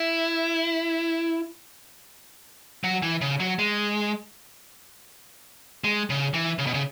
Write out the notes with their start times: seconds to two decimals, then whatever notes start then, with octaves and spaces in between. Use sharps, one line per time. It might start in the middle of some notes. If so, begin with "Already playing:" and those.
Already playing: E4
2.84 F#3
3.02 E3
3.21 C#3
3.40 F#3
3.59 G#3
5.84 G#3
6.10 C#3
6.34 E3
6.59 C#3
6.66 B2
6.74 C#3